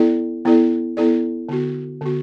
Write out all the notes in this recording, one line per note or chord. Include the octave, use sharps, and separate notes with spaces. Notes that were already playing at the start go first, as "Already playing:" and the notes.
Already playing: B3 E4 A4 D5
B3 E4 A4 D5
B3 E4 A4 D5
D3 B3 F#4
D3 B3 F#4